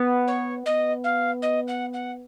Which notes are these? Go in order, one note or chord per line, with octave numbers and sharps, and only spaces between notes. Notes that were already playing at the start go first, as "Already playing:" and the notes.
Already playing: B3
C#5
B3 D#5
F5
D#5
F#5
F#5